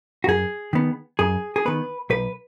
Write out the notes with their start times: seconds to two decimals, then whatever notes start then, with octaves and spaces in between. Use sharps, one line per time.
0.24 F#4
0.27 F#2 G#4
0.73 D#3 B3
1.19 F#2 G#4
1.56 G#4
1.65 D#3 B3 B4
2.10 B1 B4